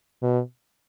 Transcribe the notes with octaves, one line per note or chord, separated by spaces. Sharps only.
B2